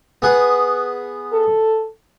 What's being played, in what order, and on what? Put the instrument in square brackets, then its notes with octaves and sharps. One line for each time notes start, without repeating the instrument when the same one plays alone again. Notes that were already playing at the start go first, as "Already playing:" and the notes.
[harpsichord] B3 G#4 F#5
[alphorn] A4